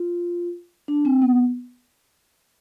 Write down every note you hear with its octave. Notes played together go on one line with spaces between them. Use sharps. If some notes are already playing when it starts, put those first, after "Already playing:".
Already playing: F4
D4
C4
B3